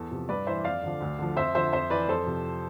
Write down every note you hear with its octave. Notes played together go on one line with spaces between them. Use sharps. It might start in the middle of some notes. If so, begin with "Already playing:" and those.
Already playing: E2 A4
C3 F3
G2 B4 D5
E3 C5 E5
F2 D5 F5
D3 F3
D2
D3 F3
F2 C5 E5
D3 F3 C5 E5
F2 C5 E5
E3 B4 D5
F2 A4 C5
C3 F3